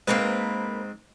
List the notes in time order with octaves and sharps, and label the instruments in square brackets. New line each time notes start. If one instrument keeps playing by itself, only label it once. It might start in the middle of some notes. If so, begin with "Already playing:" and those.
[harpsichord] G#2 C4 [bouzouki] A#3 A#4 B4